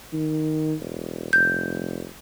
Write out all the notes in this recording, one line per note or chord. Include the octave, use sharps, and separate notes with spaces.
D#3
E1
F1 G6